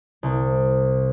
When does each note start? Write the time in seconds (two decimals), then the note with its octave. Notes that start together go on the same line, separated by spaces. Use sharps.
0.23 C2